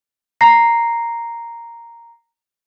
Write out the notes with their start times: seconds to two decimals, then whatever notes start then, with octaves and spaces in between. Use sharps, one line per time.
0.41 A#5 A#6 C7